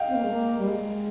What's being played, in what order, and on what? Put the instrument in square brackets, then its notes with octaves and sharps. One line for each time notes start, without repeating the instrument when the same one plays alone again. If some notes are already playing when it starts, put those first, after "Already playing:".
Already playing: [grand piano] D#5 F5 G5
[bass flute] C4
A#3
G#3
A#3
G3
G#3